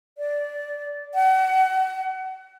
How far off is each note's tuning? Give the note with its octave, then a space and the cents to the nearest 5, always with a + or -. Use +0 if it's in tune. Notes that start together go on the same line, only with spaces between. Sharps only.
D5 -10
F#5 +35